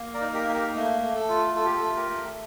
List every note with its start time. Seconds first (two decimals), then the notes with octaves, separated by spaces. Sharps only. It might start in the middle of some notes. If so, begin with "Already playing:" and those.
Already playing: A#3
0.14 A#4 D5
0.21 D#4
0.34 G4 A#4
0.48 A#3
0.54 G4 A#4
0.75 A3
1.02 A3
1.15 A4
1.29 F4
1.55 F4 A4
1.66 G4
1.77 A4
1.83 A3
1.96 G4 A#4
2.10 A3